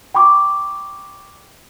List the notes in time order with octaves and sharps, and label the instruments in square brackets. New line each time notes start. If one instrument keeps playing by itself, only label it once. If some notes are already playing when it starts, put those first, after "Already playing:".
[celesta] G5 B5 C#6 D6